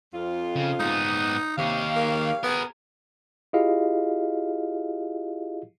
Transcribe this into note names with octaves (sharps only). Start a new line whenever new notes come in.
F2 F4
C#3
G#2 B3 D#4
D#2 C3 D#4 G4 C#5 F5
A#3
B3 G#4 A#4
E4 F4 G4 G#4 D#5 F5